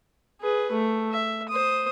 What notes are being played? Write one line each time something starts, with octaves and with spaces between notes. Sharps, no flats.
G#4 B4
A3
E5
C5 D#6